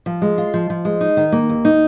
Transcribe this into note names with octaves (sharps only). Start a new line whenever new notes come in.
F3
G#3
F4
F3
F3
G#3
D#4
D#3
A#3
D#2
D#4